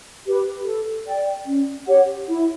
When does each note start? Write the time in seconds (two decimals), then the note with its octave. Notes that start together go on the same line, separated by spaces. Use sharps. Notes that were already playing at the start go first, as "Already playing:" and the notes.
0.26 G4 B4
0.66 A4
1.06 D5 G5
1.47 C#4
1.87 G4 C#5 F#5
2.28 E4